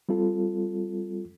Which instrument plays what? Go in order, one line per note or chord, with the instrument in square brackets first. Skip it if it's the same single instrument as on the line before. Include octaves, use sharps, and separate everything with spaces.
[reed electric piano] G3 C4 F4 A4